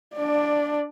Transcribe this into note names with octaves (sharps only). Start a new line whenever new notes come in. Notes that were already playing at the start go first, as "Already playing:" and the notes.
D4 D5